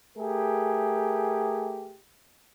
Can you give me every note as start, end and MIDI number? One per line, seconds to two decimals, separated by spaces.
0.18 1.95 57
0.18 1.95 67
0.18 1.95 68
0.18 1.95 70